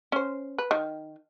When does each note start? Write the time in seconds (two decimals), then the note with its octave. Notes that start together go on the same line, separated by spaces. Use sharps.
0.12 C#4 C5
0.58 B4
0.71 D#3